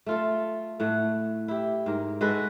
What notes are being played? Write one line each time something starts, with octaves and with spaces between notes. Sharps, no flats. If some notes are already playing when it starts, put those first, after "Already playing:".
A3 F4 A4
A2 A3 F#5
E4 G4
G#2 A#4
G#3 F#4 A4 B4